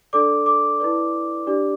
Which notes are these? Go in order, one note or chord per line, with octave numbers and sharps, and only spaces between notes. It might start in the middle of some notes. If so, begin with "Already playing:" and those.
D4 A4 D5 D6
D6
E4 B4 D5
D4 G4 D5